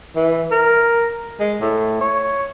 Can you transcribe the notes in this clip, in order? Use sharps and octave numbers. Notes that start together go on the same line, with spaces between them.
E3
A#4
G#3
A2
C#5